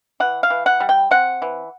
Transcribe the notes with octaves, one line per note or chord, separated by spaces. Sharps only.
E3 F#5
F5
E3
F#5
G3
G5
C4 F#5
E3